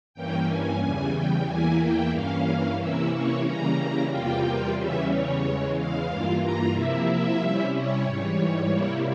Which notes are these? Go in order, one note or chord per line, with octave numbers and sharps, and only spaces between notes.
G2 E3 A#3 C#4 G5
G#5
E2 C#3 E3 G3 G#5
G5
E2 E3 A#3 E4 G#5
G5
G2 E3 A#3 C#4 F5
C3 E3 A#3 C#4 E4 E5
C#5
C#3 E3 G3 A#3 C#4 A#5
E2 C3 G3 A#3 F4 G5
E2 C#3 E3 G3 C#4 E5
C#5
E2 C#3 E3 G#3
F5
G2 E3 A#3 F4
A#5
C3 F3 A#3 E4 E5
E5
C3 G3 C#4 E4
C#5
G#2 E3 G3
C3 G3 A#3 E4